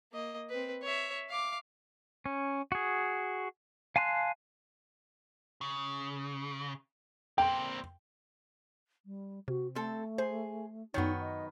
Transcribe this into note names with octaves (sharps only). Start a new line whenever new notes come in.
A#3 D#5
C4 B4
C#5 E5
F5 D6
C#4
F#4 G#4
F5 G#5 A5 C6 F#6
C#3
A#3 C4 G5
G3
C3 F#4
A3 C4 A4
G#4 C5
F#2 D#3 F#3 B3 D#4 C#5
D#5